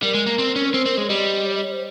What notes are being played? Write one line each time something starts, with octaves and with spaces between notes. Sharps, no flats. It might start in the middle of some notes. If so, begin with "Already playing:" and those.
G3 A#4
G#3
A#3
C4
C#4
A#4
C4 C5
C4 A#4
G#3 C#5
G3 D#5
C#5
D#5
C#5
C5